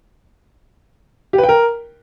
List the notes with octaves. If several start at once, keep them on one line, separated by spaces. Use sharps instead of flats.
G4
B4
G5
A#4